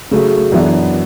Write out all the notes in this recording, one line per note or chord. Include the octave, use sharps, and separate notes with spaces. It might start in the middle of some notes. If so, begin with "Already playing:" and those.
C#3 F#3 A3
F#2 E3 B3 D4